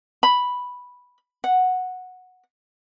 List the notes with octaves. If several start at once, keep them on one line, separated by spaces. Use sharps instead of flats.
B5
F#5